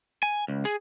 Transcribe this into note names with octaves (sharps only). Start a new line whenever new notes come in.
G#5
C#2
G#4